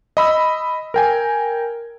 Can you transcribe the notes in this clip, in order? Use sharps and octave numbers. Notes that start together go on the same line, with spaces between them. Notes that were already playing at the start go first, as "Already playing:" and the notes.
D#5 B5 E6
A#4 G5 G#5